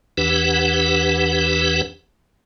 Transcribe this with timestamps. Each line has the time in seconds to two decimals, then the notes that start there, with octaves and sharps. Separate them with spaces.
0.17 E2 E3 D4 G4 B4 F#5